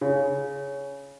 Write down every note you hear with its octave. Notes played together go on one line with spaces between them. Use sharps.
C#3